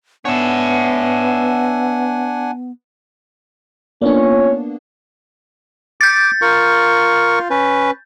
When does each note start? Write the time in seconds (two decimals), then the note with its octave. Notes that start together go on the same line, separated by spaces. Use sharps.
0.25 B3 D4 C#5 E5 F#5 G#5
4.02 A#3 B3 C#4 D4 F4 C#5
6.01 D6 G6 A6
6.42 F4 A#4 C#6
7.50 C#4 B4